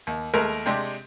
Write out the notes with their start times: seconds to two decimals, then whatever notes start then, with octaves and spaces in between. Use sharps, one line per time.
0.07 D#2
0.34 D#2 G#3 A3 A#4
0.66 C3 G#3 D4 G4